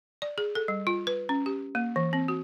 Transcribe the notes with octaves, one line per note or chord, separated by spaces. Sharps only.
D5
G#4
A4
G3
F4
B4
C#4
G4
A#3
E3
C4
F#4